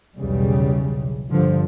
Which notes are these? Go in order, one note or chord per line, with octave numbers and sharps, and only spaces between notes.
B1 E2 C#3 G3
G2 D3 F3